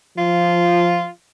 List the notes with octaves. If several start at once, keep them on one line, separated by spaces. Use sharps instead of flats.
F3 F4